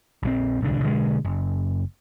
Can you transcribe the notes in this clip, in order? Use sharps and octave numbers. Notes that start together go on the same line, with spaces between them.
A#1 F#3 C4
D1 C2 D3
B2 D3 G3 G#3
F#1